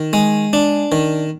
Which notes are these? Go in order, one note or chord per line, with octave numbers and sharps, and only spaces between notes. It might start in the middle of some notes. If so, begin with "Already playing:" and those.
Already playing: D#3
G#3
D4
D#3